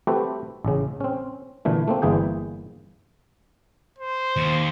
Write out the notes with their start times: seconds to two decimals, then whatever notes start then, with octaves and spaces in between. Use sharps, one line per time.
0.07 A3 C4 F#4 G4 A4 B4
0.65 A1 C#3
1.01 C4 C#4
1.65 A#2 D3 E3 A3
1.88 A3 A#3 C4
2.02 G1 E3 A#3 G#4 G5
3.99 C5
4.36 D#2